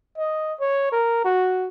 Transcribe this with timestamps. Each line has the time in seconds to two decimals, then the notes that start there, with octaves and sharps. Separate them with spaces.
0.17 D#5
0.60 C#5
0.92 A#4
1.24 F#4